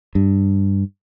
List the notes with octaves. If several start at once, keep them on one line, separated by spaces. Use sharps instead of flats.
G2